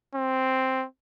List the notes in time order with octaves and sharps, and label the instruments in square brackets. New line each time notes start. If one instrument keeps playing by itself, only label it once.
[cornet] C4